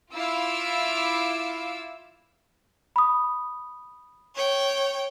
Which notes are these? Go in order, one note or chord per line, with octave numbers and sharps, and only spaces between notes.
E4 F4 F5 D6 E6
B5 D#6
C#5 G5